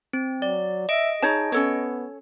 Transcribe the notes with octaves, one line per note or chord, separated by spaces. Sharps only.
C4
F#3 D5
D#5 E5 D7
D#4 G#4 C#5 A5
B3 C#4 A4 C#5